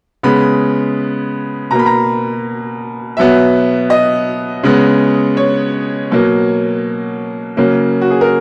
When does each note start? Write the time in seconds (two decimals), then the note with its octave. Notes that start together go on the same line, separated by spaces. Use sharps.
0.23 C#3 G#3 B3 B5
1.71 B2 A#5
1.74 A#3 B5
1.86 A#5
3.17 B2 F#3 B3 E5
3.90 D#5
4.63 C#3 G#3 B3
5.37 C#5
6.11 B2 F#3 A#3
7.57 C#3 F#3 A#3
8.01 F#4
8.11 G#4
8.21 A#4